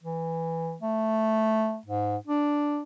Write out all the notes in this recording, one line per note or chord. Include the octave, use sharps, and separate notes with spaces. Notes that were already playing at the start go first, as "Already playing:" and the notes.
E3
A3
G#2
D4